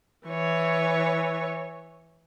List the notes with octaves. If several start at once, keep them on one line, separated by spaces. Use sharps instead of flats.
E3 C#5